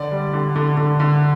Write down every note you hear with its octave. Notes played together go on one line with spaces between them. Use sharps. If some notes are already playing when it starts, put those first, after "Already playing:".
Already playing: D3 D5
G3
D3
D3
D3
D3